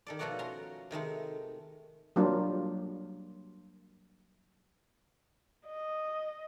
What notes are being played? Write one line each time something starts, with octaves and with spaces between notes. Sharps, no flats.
D#3 A4 D5
B2 F3 A3 B3 F#4 D5
C#4 A#5 C6
C3 D#3 G#3 A3
F#3 G3 A#3 D4 F4
D#5